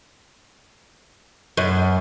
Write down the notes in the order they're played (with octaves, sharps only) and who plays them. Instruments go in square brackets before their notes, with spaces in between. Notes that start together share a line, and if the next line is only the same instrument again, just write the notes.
[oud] F#2